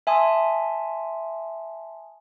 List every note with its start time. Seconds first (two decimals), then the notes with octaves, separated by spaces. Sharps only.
0.07 E5 G#5 A5 C6 D#6